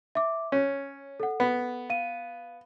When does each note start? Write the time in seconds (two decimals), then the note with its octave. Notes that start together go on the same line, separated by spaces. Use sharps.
0.15 E5 D6
0.52 C#4 C#5
1.20 A4 F#5
1.40 B3
1.90 F5 D#7